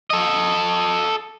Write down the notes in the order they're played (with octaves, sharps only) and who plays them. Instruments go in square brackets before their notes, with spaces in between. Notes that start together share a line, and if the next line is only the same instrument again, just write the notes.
[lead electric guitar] A4 D#5